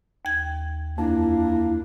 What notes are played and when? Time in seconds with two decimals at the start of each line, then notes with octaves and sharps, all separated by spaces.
0.25 D#2 G#6
0.98 F2 A#3 D4 E4